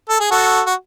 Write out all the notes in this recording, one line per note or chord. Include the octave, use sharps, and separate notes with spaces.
A4
G#4
F#4 A4
F#4